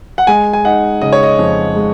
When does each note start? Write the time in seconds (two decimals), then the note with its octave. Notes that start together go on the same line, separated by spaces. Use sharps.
0.18 F#5
0.27 G#3 G#5
0.53 G#5
0.64 D#4 F#5
1.01 C#3 D#5
1.12 C#5
1.23 D#5
1.39 F2
1.76 G#3